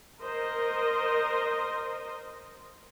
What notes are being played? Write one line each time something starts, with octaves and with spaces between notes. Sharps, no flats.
A#4 C5 D#5